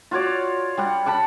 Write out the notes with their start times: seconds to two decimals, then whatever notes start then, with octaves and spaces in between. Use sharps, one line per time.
0.11 F4 F#4 C#5 D5
0.77 G3 F#5
1.06 D5 F#5 A5 B5